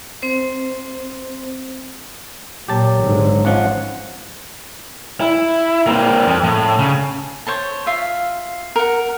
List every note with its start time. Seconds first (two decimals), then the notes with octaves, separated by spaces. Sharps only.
0.22 C4 C5
2.69 A#2 F#3 G4 A5
3.00 G#1 G#2 D3
3.45 G#1 F3 C#4 F#5
5.21 E4
5.87 A#3 C4
6.28 F2
6.44 A2
6.79 C#3
7.47 C5 C#5 A5
7.86 F4 E5 F5
8.76 A#4 F#5